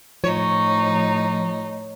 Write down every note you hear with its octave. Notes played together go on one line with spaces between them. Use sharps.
A2 F3 D#4 C#5